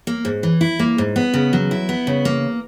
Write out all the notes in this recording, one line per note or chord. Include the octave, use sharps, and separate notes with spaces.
A#3
G#2
E3
E4
A#3
G#2
B3
C#3
F#3
E4
B3
C#3
A#3